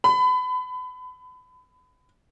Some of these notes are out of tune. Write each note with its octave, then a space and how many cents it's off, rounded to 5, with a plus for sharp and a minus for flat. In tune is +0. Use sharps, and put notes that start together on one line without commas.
B5 +30